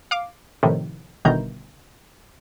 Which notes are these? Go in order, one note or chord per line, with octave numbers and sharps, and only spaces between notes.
F5 D6
A2 C3 D#3 F3
G1 B2 D#3 E3 A#5 G6